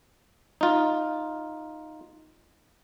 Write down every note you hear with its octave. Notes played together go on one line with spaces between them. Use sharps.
D#4 F4